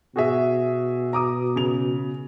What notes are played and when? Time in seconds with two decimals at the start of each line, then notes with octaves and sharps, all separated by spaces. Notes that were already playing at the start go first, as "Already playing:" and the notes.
0.16 B2 F#4 G#4 E5
1.13 A#5 D6 D#6
1.56 C#3 F7